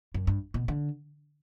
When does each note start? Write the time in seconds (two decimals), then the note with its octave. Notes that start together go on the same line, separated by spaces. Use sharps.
0.14 F#2
0.27 G2
0.54 B2
0.68 D3